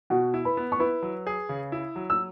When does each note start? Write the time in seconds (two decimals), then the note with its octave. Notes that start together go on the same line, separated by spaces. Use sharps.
0.10 B2 F#4 F#5
0.34 E4
0.45 B4 B5
0.57 B3
0.72 C#6
0.79 E4 B4 B5
1.02 F#3
1.27 G#4
1.49 C#3
1.72 E4
1.96 F#3
2.10 E6